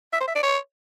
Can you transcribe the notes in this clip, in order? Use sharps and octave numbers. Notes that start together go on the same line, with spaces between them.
E5
C5
E5
D5
C#5